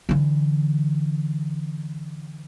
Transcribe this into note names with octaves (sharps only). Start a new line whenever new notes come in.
D3 E3